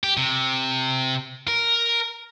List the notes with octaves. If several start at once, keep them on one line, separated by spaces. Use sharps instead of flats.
G4
C3
A#4